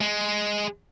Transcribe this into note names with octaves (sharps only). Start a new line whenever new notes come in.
G#3